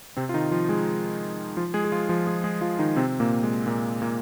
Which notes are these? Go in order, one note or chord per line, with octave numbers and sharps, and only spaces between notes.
C3 C4
F4
D#3 D#4
F3 F4
G#3 G#4
F3 F4
G#3 G#4
G#4
F3 F4
F3 F4
G#3 G#4
G#3 G#4
F3 F4
D#3 D#4
C3 C4
A#2 A#3
G#3
A#2 A#3
A#2 A#3